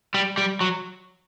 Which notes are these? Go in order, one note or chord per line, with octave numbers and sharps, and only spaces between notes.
G3
G3
F#3